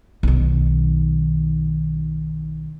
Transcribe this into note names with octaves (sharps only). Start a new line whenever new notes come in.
B1 D#3